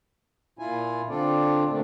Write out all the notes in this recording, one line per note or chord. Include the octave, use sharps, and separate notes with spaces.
A#2 E4 F4 G#5
D3 C4 D4 F4 A4 D5
A#2 D3 A3 C4 D4